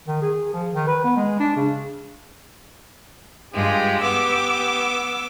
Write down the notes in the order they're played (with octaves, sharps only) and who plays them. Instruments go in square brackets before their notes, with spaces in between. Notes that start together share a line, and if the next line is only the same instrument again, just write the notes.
[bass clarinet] D#3
G#4
F3
D#3
B4
B3
G#3
D4
C#3
[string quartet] G2 G#3 F4 [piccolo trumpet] G4
[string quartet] B3 D6 E6